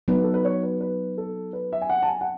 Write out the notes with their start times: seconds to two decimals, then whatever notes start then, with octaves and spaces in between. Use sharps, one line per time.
0.08 F#3 B3 D#4 B4
0.24 A4
0.34 B4
0.44 C#5
0.63 B4
0.81 B4
1.18 A4
1.53 B4
1.73 E5
1.82 G#5
1.90 F#5
2.02 A5
2.08 G#5
2.21 F#5